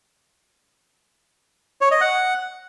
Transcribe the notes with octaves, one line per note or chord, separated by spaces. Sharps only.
C#5
D#5
F#5